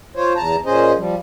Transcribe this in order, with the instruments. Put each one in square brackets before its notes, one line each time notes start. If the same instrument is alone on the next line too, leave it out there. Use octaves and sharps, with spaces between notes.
[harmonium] F4 C5 C#5
E2 A5 A#5
A#2 C#4 G#4 C5 D#5
F3 G3